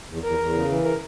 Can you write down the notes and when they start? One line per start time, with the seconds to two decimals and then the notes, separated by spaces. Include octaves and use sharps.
0.08 E2
0.23 E2 A#4
0.39 E2
0.54 C#3
0.69 E3
0.84 A#4